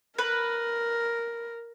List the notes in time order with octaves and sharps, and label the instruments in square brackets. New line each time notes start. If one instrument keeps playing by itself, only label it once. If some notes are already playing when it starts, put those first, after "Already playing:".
[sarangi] A#4 [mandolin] B4